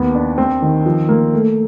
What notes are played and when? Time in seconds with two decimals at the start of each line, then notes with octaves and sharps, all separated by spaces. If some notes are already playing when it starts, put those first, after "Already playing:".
Already playing: D#2 B3
0.15 D4
0.38 C4
0.62 D#3
0.86 F3
1.09 A#3
1.33 A3